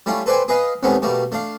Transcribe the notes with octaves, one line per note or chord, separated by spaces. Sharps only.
G3 A3 C#4 E4 F4
A4 B4 C5 D5 G5 G#5
G#4 B4 D#5 F5
D#2 C3 G#3 A3 B3 C#4
B2 G3 A3 A#3
A3 D4 F5